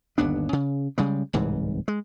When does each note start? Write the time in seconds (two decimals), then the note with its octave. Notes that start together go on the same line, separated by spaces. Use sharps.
0.18 G1 D#2 B3 D4
0.53 C#3
0.98 C#3 G3 G#3
1.33 D1 C2 G#2 E3
1.88 G#3